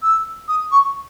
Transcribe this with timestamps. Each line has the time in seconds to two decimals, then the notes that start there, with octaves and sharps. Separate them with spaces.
0.02 E6
0.48 D#6
0.71 C#6